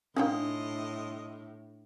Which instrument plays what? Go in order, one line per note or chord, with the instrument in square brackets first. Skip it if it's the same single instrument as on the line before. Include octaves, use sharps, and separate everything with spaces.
[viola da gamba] A2 [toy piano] D4 [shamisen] D#4 F4 G5 [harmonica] D#5 C6